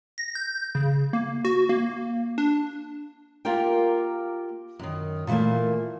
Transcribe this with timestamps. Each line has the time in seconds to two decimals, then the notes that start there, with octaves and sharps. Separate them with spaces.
0.18 A#6
0.35 G6
0.75 C#3
1.13 A#3
1.45 F#4
1.69 A#3
2.38 D4
3.45 A#3 F4 G4 A#4 G5
4.79 F#2 D#3
5.27 A#2 E3 F#3 A3 A#3